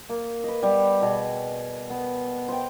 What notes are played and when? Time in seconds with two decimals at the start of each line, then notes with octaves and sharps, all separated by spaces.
0.09 A#3
0.44 B4 D#5
0.63 G3 B3
1.02 B2 G#4
1.90 B3
2.48 C5 G5